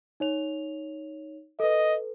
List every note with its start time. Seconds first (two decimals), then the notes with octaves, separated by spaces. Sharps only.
0.20 D#4 C#5 F7
1.60 A4 B4 D#5